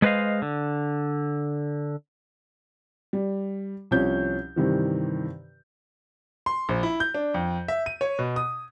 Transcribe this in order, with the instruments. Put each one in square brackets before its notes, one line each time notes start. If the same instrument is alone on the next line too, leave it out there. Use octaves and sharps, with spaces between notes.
[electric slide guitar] G#3 A3 B4 C5 D#5 F5
D3
[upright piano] G3
C2 F3 C#4 G6
G2 C3 D#3 E3
[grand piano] C6
A#1
E4
G6
D4
F2
E5
D#7
C#5
B2
D#6